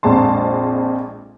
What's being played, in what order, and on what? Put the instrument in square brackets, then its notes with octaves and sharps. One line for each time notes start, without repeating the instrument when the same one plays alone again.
[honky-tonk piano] A#1 F2 G#3 A5 C6